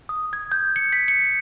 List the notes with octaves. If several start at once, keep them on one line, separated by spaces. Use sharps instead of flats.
D#6
G#6
G6
C#7
B6
C#7